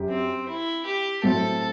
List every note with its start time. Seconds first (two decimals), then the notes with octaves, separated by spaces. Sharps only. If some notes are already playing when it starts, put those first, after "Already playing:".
Already playing: F#2 G4
0.10 C4
0.48 E4
0.86 G4
1.23 A2 F#3 C4 A4